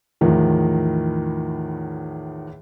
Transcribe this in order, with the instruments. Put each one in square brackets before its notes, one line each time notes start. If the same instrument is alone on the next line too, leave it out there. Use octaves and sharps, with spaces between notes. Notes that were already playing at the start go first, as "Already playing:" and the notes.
[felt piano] E2 A2 D#3 F3